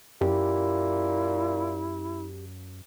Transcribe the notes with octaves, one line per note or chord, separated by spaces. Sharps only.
F#2 A#2 E4 G4